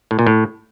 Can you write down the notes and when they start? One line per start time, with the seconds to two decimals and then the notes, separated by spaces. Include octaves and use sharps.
0.11 A2
0.19 A#2
0.27 A2